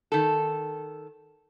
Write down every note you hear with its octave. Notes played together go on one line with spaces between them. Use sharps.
D#3 A4